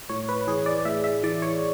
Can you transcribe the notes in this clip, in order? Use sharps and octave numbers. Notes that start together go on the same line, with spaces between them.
A2 C#5
B4
E3 G#4
D5
A2 E5
E5
E3 D5
C#5